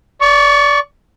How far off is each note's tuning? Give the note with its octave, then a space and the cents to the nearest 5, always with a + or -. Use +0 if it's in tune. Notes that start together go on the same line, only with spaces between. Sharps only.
D5 -20 C#6 +15